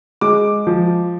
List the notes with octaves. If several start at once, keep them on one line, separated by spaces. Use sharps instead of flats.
G#3 D6
F3